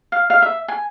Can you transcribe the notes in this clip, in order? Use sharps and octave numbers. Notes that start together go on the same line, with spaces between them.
F5
F5
E5
G#5